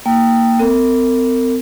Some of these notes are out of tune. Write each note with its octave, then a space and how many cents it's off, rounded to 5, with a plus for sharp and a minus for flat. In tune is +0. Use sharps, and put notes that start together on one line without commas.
A#3 -10 G5 +0
C4 -40 A#4 -40